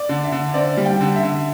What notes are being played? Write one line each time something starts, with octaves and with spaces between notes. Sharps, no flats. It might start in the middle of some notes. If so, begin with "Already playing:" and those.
Already playing: D5
D3
E5
D3
C4 D5
G3
G5
D3
E5
D3